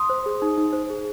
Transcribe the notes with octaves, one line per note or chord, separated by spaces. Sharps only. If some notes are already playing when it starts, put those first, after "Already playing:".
Already playing: C6 D#6
C5
G#4
D#4
D#4
C5
G#4